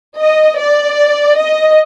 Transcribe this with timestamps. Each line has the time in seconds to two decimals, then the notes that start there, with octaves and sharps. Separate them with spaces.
0.18 D#5
0.58 D5
1.38 D#5